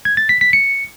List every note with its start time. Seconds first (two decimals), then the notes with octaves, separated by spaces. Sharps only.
0.05 G#6
0.17 A6
0.29 B6
0.41 B6
0.53 C#7